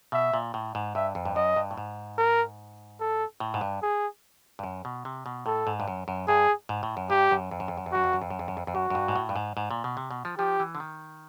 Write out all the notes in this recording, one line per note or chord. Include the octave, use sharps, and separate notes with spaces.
B2 E5
A#2
A2
G#2
G2 E5
F2
G2
F#2 D#5
G2
A2
G#2
A#4
A4
A2
G#2
G2
G#4
G2
F#2
B2
C3
B2
A2 A4
G#2
G2
F#2
F#2
G2 G#4
G#2
A2
F#2
G2 G4
F#2
F2
F#2
F2
F#2
F2
F#2 F#4
F2
F#2
F2
F#2
F2
F#2
F2
F2
F#2 F#4
F#2
G2
G#2
A2
G2
G#2
G#2
A#2
B2
C3
B2
F3
F3 G4
E3
D3
D#3